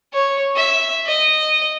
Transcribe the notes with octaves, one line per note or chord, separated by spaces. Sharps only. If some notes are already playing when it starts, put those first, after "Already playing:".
C#5
E5
D#5